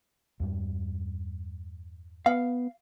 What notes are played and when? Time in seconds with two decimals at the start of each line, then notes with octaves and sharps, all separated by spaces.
0.40 E2 G2 G3
2.26 B3 F5